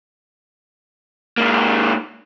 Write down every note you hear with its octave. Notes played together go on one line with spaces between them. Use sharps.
G#2 A#3